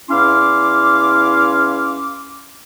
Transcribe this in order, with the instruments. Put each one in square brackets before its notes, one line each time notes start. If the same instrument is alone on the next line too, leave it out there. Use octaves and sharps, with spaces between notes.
[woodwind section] E2 C#4 E4 F5 C6 D6